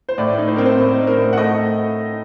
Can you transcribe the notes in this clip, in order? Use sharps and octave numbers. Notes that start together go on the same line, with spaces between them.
C5
A2 D5
D#4
C5
C4 A#4
C5
A2
D#4
A#4
A2
F#5
A3 D#5